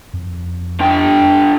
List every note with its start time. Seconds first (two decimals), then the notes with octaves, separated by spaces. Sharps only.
0.14 F2
0.81 D3 G5